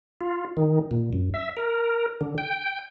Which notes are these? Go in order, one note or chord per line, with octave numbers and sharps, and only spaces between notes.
F4
D#3
A#2
F#2
E5
A#4
D3
G5